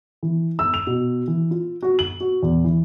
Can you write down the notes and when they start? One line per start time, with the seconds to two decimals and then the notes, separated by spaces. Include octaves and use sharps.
0.23 E3
0.59 E6
0.74 F7
0.87 B2
1.28 E3
1.51 F4
1.82 F#4
1.99 F#7
2.20 F#4
2.42 E2
2.64 E3